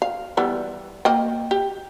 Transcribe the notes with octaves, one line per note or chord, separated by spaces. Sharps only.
F5
E3 G3 B3
A#3 D#5 G5
G4